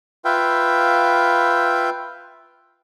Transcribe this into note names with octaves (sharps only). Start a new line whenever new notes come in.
F4 B4 E5 F5 G5